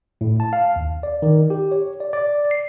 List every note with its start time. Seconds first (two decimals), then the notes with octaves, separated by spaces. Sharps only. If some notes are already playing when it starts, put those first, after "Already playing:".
0.21 A2
0.40 A5
0.53 F5
0.76 D#2
1.03 D5
1.22 D#3
1.50 G4
1.72 C#5
2.00 D5
2.13 D5
2.51 C7